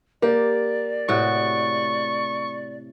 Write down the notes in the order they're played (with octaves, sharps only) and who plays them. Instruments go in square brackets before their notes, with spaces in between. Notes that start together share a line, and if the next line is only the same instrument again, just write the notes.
[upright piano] A#3 [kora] G4 [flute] D5
[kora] A2 C3 F#4 [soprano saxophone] C#6